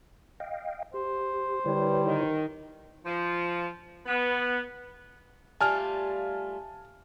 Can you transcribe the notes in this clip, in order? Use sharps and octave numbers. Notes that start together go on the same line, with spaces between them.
D#5 F5 G5
G4 C5
D3 G3 E4 B4 C#5
D#3
F3
B3
G3 A3 F4 G#5 A5 F6